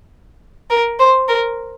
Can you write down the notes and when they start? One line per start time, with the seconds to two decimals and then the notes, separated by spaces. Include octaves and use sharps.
0.70 A#4
0.99 C5
1.28 A#4